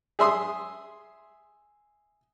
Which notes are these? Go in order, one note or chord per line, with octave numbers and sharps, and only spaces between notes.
G#4 E5 C6 D#6